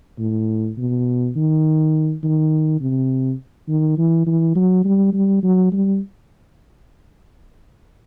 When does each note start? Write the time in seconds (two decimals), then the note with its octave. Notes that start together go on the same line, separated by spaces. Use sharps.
0.19 A2
0.78 B2
1.36 D#3
2.23 D#3
2.81 C3
3.68 D#3
3.98 E3
4.27 E3
4.56 F#3
4.85 G3
5.13 G3
5.43 F#3
5.72 G3